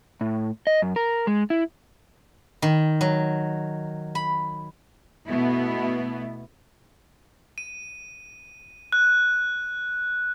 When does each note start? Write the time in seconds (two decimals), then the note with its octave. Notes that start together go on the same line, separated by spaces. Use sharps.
0.21 A2
0.67 D#5
0.82 F#2
0.96 A#4
1.27 G#3
1.50 E4
2.62 D#3
3.01 F#3
4.15 B5
5.28 B2 A3 B3 E4
7.58 D#7
8.92 F#6